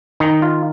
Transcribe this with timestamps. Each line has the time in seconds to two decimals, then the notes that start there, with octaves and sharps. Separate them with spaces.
0.20 D#3 D#4
0.42 F4